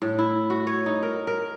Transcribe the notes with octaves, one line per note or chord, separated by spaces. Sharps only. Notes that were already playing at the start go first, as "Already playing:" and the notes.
A2
E4
F#4
C#5
D#4
A#4
A#4